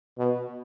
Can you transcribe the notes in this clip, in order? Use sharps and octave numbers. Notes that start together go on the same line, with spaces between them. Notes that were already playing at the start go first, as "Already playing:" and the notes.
B2